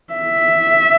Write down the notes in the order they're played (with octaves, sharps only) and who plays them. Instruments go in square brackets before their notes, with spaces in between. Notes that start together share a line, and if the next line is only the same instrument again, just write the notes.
[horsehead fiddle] E5